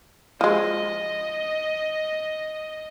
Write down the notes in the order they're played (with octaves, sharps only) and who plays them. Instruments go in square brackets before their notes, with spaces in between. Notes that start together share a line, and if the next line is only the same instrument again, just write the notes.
[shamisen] F3 G#3 [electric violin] D#5